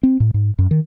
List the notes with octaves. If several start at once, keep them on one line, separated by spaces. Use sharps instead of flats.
C4
A2
G#2
F#2
D#3